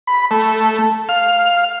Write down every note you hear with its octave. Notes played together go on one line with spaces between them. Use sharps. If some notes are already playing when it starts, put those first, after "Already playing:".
B5
A3
F5